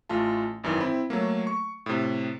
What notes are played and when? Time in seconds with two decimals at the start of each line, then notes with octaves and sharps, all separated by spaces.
0.09 A1 A3 F4 A5
0.64 G#1 F#2 D#3 E3
0.80 C4 E4 B5
1.10 F#3 A3 A#3
1.47 C#6
1.86 A2 C3